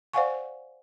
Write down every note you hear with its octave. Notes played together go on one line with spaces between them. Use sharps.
C5 D5 F5 F#5 G#5 C#6